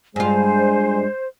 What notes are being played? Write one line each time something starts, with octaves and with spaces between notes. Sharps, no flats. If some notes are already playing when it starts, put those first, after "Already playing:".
G2 G#3 F4 C5 G#5